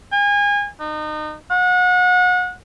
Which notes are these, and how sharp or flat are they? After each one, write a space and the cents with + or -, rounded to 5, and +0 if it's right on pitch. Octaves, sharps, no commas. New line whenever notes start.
G#5 -30
D#4 -30
F#5 -30